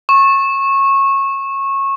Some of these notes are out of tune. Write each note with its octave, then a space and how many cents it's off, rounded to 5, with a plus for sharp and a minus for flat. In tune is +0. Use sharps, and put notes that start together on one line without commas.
C#6 -20